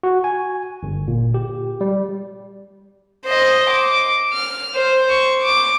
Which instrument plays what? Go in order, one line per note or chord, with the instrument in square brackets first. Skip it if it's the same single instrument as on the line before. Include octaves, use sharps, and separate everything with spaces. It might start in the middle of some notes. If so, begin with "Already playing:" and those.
[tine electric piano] F#4
G#5
G1
A#2
G4
G3
[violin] C5 D#5
D6
F6
C5
C#6
D6